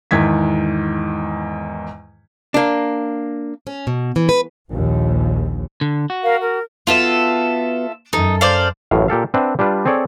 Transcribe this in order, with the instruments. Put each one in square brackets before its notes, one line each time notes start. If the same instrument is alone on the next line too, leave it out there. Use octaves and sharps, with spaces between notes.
[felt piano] E2 G#2 D#3 G#6 B6
[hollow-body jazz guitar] A#3 D4
[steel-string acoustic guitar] C#4
B2
E3
B4
[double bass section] A#1 D#2
[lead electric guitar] D3
F#4
[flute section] A#4 F5
A#4
[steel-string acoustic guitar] B3 F#4 [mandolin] F4 A4 E5
[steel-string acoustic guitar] F#2 A4 [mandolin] D#4
[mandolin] C5 D5 F5
[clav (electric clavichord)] A1 F#2 A2 F5
A#2 G4 A4 F5
C4 D4 B4 E5 F#5
G3 D4 F4 B4
C4 G#4 A4 C#5 D5